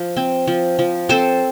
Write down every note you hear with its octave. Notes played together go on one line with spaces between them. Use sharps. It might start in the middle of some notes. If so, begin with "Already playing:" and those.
Already playing: F3
C4
F3
F3
C4 A4 C5